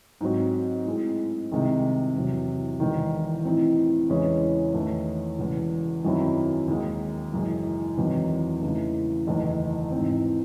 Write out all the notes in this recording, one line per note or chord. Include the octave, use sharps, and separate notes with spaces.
G#2 F#3 C4 F#4
A2 G#3 C4
C2 C3 D#3 G#3
E2 C3 F#3
E1 E2 D#3
A2 E3 C4 D#4
E2 C#3 E3 G#3 C#4
E2 D#3 A3 C#4
E1 E2 C#3
F#2 D#3 F#3 C4 E4
D#2 D#3 G#3
F#1 F#2 E3 G#3
E1 E2 D#3 F#3 C4
E2 C#3 E3 A3 D#4
F#1 E2 D#3 A3
G#2 E3 C4